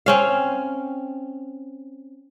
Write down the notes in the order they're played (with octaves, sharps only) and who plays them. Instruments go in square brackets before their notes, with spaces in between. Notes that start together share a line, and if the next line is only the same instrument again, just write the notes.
[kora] C4 C#4 F5